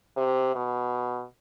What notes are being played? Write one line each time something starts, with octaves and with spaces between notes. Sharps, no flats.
C3
B2